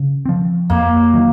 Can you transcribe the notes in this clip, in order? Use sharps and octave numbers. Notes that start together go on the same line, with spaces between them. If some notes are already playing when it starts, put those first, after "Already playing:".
Already playing: C#3
F3 C4
F2 A#3
D#3 F#3